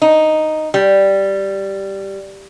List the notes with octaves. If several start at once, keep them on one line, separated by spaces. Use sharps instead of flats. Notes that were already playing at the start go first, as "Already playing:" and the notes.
D#4
G3